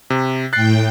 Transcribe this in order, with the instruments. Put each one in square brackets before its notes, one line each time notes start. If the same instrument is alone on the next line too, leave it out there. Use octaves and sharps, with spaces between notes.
[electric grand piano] C3
[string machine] A2 G5 [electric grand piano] F#6 A6 C7